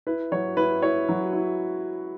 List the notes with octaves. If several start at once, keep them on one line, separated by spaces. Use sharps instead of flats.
E4 B4
F#3 C#5
E4 B4
E4 C#5
F#3
E4